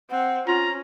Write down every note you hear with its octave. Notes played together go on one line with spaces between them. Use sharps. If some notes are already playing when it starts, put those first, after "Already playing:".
C4 F#5
C#4 F4 A#5